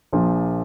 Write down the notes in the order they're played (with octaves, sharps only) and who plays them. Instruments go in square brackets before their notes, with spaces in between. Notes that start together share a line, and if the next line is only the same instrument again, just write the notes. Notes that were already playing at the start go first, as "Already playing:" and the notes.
[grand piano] A#1 A#2 F3